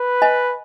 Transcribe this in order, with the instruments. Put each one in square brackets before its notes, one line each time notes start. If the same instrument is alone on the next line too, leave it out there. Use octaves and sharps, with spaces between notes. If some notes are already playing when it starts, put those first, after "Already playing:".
Already playing: [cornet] B4
[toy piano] D#5 G#5 B5